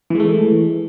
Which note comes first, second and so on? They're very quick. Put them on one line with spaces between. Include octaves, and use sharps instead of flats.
E3 G#3 A3